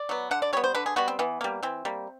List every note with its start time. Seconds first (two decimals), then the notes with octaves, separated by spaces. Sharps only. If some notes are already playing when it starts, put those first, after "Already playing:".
Already playing: D5
0.09 F#3 B3
0.31 D3 F#5
0.42 D5
0.53 G3 B3 C#5
0.64 C5
0.75 D3 B4
0.86 G#4
0.96 G3 B3 F#4
1.08 C4
1.19 E3 B3
1.41 G3 A#3
1.63 E3 C4
1.85 G3 A#3